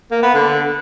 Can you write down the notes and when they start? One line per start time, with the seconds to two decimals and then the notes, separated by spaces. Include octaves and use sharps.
0.11 A#3
0.23 B3
0.34 D3